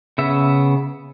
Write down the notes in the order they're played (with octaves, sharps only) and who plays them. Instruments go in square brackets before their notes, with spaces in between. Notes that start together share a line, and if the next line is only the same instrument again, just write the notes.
[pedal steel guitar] C#3 B3 E5